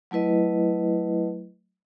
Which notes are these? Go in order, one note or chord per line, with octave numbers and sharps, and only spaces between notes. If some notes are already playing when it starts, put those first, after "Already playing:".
F#3 A3 E4 B4 D#5